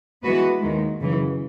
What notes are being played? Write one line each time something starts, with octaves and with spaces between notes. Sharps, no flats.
E3 G#3 B3 F#4 B4
D#2 D#3 G#3
F#2 C#3 E3